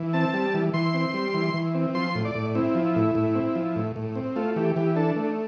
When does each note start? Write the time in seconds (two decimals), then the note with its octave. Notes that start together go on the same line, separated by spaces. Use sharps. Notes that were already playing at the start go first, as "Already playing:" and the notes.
Already playing: E3
0.13 C4 A5
0.34 G3
0.54 E3
0.74 E3 C6
0.94 C4
1.14 G3
1.34 E3
1.54 E3
1.75 C4
1.95 F3 C6
2.15 A2
2.25 D5
2.35 A2
2.55 C4 E4
2.75 F3
2.96 A2
3.15 A2
3.35 C4
3.55 F3
3.76 A2
3.96 A2
4.15 C4
4.36 A3 F4
4.56 E3 G4
4.76 E3 G4
4.96 D4 A4
5.16 A3